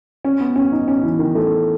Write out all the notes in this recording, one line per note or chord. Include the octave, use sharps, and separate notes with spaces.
C#4
B3
C#4
D#4
C#4
E3
D#3
A3